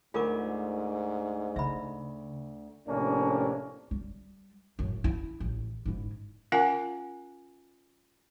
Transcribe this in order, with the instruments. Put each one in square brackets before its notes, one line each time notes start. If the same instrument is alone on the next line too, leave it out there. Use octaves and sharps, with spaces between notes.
[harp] D2 [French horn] G#2 [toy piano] F4 A#4 D6
[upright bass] C#3 [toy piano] E5 B5
[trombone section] A#1 A2 C3 A#3 C#4 D4
[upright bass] G3
F#2 A2
E4
A1
G#2 E4
[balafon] C#4 F4 A#4 F5 F#5 G#5